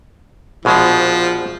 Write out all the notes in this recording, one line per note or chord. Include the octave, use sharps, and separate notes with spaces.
A#1 B2 F3 G#3